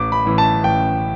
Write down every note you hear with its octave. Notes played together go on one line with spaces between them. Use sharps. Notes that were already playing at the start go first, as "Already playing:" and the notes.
Already playing: A1 D6
B5
A2 E3
A5
A1 G5